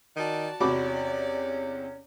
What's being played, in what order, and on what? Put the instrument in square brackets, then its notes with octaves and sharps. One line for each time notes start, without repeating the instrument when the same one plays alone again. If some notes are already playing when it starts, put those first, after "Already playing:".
[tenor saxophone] D#3 [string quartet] F#4 D5 A5
[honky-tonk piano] E2 C3 [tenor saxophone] C#4 [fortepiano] F#4 B5 D6 [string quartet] D5